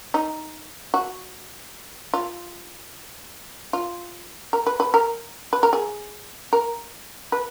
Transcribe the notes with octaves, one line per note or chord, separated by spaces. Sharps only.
D#4
F#4
F4
F4
A#4
B4
B4
A#4
B4
A#4
G#4
A#4
B4